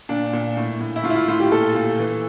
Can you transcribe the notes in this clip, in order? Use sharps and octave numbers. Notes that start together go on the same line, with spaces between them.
A#2 D4
A#2
A2
A2
E4
A2 F4
E4
F4
A2 F4
G4
A#2 A4
A#2
E3